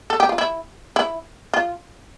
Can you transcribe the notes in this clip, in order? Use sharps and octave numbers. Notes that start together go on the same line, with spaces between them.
A4
G4
F4
E4
E4
F4